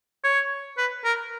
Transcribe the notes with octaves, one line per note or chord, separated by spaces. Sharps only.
C#5
B4
A#4